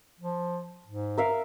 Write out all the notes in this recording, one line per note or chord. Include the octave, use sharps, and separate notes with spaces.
F3
G#2
A#4 E5 F5